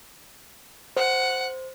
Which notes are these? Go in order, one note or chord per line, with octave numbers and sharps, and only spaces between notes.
C5 F#5